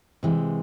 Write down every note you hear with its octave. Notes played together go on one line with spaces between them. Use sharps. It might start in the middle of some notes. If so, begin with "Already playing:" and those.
C3 E3 G#3